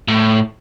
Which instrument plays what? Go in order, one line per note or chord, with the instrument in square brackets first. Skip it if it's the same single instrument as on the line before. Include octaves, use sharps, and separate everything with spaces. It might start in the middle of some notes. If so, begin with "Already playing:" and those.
[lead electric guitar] A2